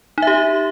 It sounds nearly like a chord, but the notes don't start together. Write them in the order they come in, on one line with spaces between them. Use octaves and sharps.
D#4 E5 G4